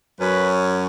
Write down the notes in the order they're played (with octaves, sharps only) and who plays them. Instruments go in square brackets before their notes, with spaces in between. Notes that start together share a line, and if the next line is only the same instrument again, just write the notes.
[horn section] F#2 F#3 C#4 B4